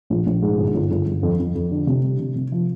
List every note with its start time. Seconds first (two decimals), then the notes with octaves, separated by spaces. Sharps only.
0.10 A#1
0.26 A#1
0.42 G#2
0.58 G1
0.74 G1
0.91 G1
1.07 G1
1.23 F2
1.40 F2
1.55 F2
1.71 D3
1.87 C3
2.03 G3
2.19 C3
2.36 C3
2.52 F3